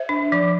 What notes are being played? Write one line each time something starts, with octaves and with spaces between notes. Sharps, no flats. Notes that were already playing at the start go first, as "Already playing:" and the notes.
Already playing: C5 E5
D4
F3